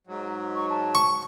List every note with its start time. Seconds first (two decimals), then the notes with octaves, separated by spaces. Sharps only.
0.07 G#2 F#3
0.55 C#6
0.70 A5
0.95 C#6